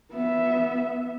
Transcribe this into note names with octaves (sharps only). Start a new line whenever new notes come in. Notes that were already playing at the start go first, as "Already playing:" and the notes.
B3 E5